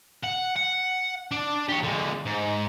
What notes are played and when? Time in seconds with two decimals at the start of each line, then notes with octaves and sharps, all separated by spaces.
0.23 F#5
0.56 F#5
1.31 D4
1.69 G4 C#5
1.84 D3 G#3
2.26 G#2